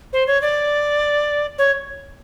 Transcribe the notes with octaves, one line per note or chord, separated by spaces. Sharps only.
C5
C#5
D5
C#5